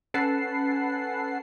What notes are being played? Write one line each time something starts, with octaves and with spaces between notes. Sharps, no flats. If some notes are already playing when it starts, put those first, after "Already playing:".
C#4 A4 B4 F#5 A5 C7